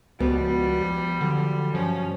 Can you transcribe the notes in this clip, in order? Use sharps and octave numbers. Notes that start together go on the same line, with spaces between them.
C#2 F3 G3 B3 F#4
D3 F#3
G2 F3 C#4